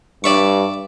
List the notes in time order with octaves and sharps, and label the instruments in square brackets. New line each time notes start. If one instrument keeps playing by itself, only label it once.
[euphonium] G2 [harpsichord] D5 E5 C#6